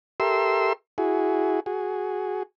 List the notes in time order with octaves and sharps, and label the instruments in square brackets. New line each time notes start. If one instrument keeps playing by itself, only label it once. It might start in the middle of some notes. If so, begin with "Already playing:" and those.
[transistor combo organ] G4 A4 A#4 E5 C6 E6
E4 F#4 G#4
F#4 G#4